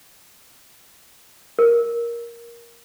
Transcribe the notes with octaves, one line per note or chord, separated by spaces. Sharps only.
A#4